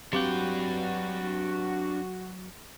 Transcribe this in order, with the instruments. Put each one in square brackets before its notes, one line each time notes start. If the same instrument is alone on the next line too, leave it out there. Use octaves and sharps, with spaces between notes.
[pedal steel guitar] F#3 G5 [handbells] C4 G4 [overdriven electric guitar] D4 B4 [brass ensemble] F#4